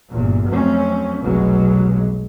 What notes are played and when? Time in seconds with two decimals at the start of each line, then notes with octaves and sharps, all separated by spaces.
0.10 G1 E2 A#2
0.47 F2 F#3 A3 C4 C#4
1.20 F1 B1 B2 F#3 G#3